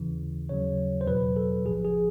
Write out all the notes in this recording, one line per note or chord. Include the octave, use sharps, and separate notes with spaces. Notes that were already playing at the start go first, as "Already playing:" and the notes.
Already playing: D#2 C#3 E3
D#2 C#3 F#3 C#5
C5
E2 B2 F#3 B4
A4
A#1 A2 F3 G#4
G#4